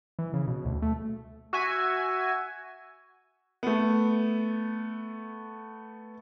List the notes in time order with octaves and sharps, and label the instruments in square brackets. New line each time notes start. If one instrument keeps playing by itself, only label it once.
[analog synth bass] E3
C#3
B2
D2
A3
[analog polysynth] F#4 E5 G#5
[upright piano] A3 B3